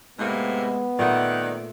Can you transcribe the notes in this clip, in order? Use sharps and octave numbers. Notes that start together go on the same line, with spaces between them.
A2 C3 G#3 A#3 B3
A#2 D#3 A3 A4 D5 F#5